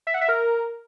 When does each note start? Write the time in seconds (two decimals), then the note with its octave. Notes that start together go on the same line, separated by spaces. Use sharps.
0.07 E5
0.14 F#5
0.21 E5
0.28 A#4